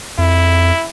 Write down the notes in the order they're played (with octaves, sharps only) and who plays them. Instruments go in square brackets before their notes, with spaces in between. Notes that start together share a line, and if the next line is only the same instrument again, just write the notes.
[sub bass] F2 [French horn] E4